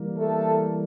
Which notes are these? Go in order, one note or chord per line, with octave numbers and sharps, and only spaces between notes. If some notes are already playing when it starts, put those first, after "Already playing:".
Already playing: E3 G3 A#3
A3 A4